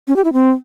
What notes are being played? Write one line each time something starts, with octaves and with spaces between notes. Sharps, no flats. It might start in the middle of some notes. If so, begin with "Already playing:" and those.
C#4
G4
E4
C4